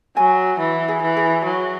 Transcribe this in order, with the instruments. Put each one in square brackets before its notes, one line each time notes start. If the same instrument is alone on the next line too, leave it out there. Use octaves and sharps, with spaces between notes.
[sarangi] F#3 [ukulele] G#5
[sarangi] E3
[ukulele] G#4
[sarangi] E3
[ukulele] G#4
[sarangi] F#3